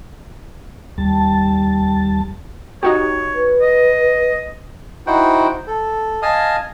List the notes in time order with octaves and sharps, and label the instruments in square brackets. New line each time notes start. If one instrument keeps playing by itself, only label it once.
[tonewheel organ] D#2 G3 A5
[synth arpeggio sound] D#4 F#4 G4 [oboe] C#5
[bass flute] B4
[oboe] D#5
[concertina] D#4 E4 F#4 C5 F#5 G5
A4
D#5 F5 G#5 A5 D#6 F6